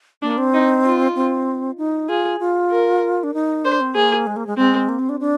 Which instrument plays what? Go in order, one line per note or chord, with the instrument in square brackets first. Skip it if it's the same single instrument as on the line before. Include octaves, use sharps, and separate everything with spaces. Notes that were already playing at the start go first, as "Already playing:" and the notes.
[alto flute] A#3 [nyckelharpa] D4
[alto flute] C4
[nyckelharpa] D#4
F4
[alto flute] C4
D#4
[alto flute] F4 [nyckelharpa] G#4
[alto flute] F4
[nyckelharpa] A#4
[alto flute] D4
D#4
[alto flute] D4 [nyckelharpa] C5
[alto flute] C4
[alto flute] A#3 [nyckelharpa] G#4
[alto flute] G#3
A#3
G#3
[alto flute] G#3 [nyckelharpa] C4
[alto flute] A#3
C4
D4
D4